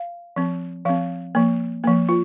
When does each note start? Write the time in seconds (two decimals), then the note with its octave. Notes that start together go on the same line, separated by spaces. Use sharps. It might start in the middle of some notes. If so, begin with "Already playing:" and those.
Already playing: F5
0.36 F3 C4
0.85 F3 C4 F5
1.35 F3 A#3
1.84 F3 A#3
2.09 F4